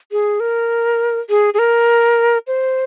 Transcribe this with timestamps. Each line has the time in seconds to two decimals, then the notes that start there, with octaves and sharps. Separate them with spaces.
0.12 G#4
0.40 A#4
1.29 G#4
1.54 G#4
1.59 A#4
2.47 C5